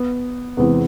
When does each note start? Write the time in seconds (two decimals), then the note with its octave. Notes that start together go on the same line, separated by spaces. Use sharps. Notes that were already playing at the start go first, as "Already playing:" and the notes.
Already playing: B3
0.57 E2 C3 E3 G#3 B3 C4